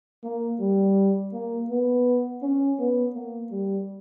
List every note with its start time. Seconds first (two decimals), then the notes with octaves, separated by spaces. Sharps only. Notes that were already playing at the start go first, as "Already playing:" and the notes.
0.23 A#3
0.60 G3
1.33 A#3
1.69 B3
2.42 C#4
2.79 B3
3.15 A#3
3.51 G3